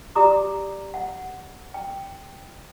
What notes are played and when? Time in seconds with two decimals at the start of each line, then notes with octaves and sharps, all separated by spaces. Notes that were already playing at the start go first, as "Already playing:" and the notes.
0.15 E4 G4 D5 A#5 D6 D#6
0.94 F#5
1.74 G5